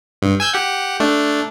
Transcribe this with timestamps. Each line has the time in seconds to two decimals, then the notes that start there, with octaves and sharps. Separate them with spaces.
0.22 G2
0.40 G#5 E6 G6
0.54 G4 F#5
1.00 A3 D4